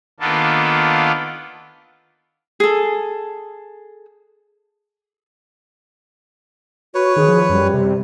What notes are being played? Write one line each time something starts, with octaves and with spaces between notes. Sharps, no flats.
D#3 A#3 B3 D4 F4 A4
G#4 A4
F#4 B4 C#5
D#3 G#4
F3
F#2 G3
C3